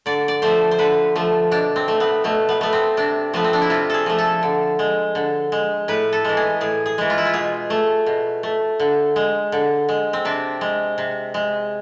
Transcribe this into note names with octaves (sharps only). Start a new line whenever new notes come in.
D3 D5
D5
F3 A3 C5
C5
D3 B4
F3 A3
B2 D4
C4
A3
B3
B2 A3
B3
A3 B3
C4
C3 D4
F3 A3 B3
C4
D4
E4
C3 F4
G#4 A4
F3 A3
A4
D3
G#3
D3
G#3
A2 B4
A4
E3 G#3
G#4
A2 G#4
G#4
E3 G#3
F4
E4
F4
B2 G#4
A3
B2
A3
D3
G#3
D3
G#3
C4
C3 D4
G#3
C3
G#3